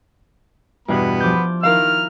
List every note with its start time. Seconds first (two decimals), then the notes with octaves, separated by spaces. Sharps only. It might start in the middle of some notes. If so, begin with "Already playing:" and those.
0.88 E2 G2 B2 B3 B5
1.20 F3 D6 G6
1.63 D#3 E4 A#4 F5 F6